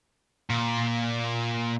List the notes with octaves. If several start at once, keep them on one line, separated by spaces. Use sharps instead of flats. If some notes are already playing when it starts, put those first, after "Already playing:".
A#2